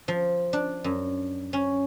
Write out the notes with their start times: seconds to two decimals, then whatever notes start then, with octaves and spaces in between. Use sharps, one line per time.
0.08 F3
0.53 D4
0.84 F#2
1.53 C#4